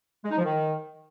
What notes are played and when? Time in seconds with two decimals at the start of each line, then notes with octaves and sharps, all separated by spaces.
0.24 G#3
0.31 D#4
0.38 F3
0.45 D#3